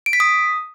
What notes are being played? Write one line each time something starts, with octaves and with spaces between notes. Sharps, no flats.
D7
B6
D#6